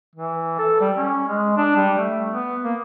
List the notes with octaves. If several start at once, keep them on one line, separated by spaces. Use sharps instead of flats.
E3
A4
G3
C#4
G#3
D4
G3
A3
B3
A#3